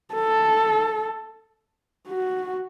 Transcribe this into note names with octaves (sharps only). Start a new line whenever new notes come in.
A4
F#4